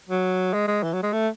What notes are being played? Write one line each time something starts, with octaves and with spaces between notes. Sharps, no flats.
F#3
G#3
G#3
E3
F#3
G#3
A3